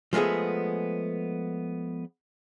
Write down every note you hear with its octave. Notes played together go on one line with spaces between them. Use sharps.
F3 G#3 A3 B3 G#4